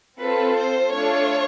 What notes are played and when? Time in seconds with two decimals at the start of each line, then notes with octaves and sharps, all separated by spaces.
0.20 C4 F4 A4 B4
0.57 C5
0.94 A3 D4 F4 A4 C#5